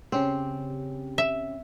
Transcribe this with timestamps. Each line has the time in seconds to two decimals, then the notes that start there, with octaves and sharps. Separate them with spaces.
0.12 C#3 C4 C#4 G4
1.18 E5